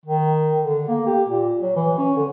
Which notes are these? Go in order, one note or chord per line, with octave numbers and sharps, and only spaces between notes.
D#3
D3
A#3
G4
A#2
F#3
E3
C#4
D3